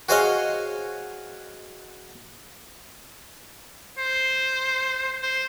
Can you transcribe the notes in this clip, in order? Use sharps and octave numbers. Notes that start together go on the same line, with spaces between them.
F#4 G#4 C5 C#5 D#5 F5
C5
C5